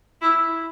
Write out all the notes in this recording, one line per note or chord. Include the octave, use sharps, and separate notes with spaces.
E4